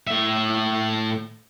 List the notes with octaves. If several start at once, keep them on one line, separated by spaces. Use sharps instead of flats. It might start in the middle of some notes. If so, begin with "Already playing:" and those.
A2 E5